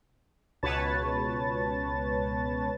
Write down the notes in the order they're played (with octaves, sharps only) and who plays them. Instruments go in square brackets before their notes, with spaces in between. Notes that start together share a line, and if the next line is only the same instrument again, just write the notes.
[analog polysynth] C#2 B2 B4 C#5 A5 A6